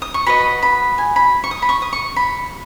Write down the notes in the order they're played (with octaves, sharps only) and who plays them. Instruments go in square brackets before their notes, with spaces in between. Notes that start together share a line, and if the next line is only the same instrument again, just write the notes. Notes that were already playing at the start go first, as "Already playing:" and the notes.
[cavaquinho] D#6
C#6
F#4 B4 D#5 B5
B5
G#5
B5
C#6
D#6
B5
C#6
D#6
C#6
B5